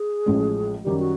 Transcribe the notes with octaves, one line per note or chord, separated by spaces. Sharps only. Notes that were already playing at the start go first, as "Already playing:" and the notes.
Already playing: G#4
A1 A2 F3 G#3 C#4
F#2 D#3 G3 G4
F#4